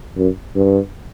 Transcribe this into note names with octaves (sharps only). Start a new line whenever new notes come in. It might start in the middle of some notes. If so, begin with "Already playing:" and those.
F#2
G2